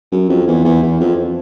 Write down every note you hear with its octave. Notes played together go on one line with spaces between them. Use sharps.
F#2
F2
E2
E2
E2
F2